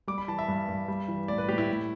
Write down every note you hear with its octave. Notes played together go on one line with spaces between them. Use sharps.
G3 D6
B5
E3 A5
E5
G2
G2
G3
E3
A2 D5
B4
A2 G4
E4
A2